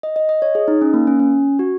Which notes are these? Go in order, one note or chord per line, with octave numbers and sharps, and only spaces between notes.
D#5
D#5
D#5
C#5
G#4
D#4
C#4
A#3
C#4
C#4
F#4